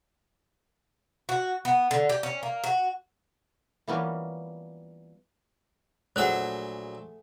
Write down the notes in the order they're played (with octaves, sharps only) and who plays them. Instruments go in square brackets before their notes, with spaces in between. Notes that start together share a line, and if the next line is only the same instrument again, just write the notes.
[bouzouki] F#4
B3
D3
G4
C#4
A#3
F#4
[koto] E3 F3 G3 A#3 B3 C#4
[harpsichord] A#1 F#3 E5 [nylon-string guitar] A3 G#4 [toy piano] C5 F#5